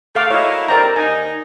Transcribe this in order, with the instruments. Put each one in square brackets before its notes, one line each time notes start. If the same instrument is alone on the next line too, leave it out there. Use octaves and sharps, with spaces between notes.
[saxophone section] A3 [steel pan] A4 F5 D6
[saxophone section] F#3 A#3 E4 [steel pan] C#5 D#5
[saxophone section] D3 G3 C4 [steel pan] A#4 D5 A#5
[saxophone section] D#2 D#4 [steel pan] G#5